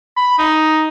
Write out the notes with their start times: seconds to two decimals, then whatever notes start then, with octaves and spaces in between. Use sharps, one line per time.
0.17 B5
0.39 D#4